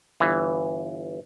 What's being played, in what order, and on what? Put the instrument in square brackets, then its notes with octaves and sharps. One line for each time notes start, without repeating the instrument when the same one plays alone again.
[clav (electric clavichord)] G1 E3